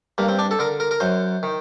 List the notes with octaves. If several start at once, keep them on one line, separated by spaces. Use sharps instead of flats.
G2 A#3
C4
D4
A4
D3 A#4
A#4
A#4
F#2 C5
D#3